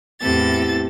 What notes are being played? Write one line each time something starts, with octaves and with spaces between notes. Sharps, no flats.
E2 A2 C3 A4 A6